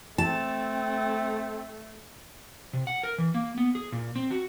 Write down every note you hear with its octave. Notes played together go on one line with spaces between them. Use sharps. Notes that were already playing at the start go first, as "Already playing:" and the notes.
A3 C4 A5
C3
F#5
A#4
E3
A#3
B3
G#4
A#2
C4
F#4